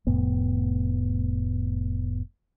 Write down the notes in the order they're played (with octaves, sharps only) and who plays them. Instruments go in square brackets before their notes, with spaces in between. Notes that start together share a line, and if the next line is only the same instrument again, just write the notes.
[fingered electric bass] F1 F2 A2 B3